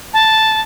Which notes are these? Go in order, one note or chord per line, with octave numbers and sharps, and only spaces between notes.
A5